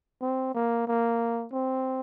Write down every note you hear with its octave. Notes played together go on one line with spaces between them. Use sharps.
C4
A#3
A#3
C4